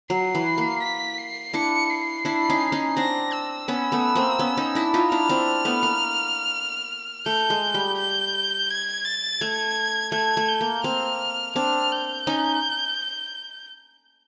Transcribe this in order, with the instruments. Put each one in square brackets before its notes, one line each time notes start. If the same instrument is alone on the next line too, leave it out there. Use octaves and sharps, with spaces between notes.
[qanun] F#3 [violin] C7
[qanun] E3
A#3
[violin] B6
C7
[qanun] D4 E4 [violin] C#7
[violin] C7
[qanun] D4 E4
C#4 D#4
C#4 D#4
[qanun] C4 D4 [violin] A#6
[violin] E6
[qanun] B3 C#4
A3 B3
A#3 C4
B3 C#4
C#4 D#4
D4 E4
D#4 F4
[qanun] D4 E4 [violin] F6
[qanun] C4 D4
A3 B3
A#3
[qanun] A3 [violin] G6
[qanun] G#3
G3
[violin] G6
G#6
A6
[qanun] A3 [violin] G#6
[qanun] A3 [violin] G#6
[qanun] A3
[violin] G6
[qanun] A#3
[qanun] A#3 C4 [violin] F6
[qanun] C4 D4 [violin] F6
[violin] G6
[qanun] C#4 D#4